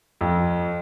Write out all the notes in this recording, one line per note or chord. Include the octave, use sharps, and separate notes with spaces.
F2